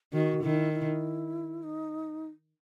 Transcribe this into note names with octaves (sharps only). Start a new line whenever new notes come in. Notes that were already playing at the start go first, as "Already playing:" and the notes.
D#3 F#4
D#3 E4
E4
D#4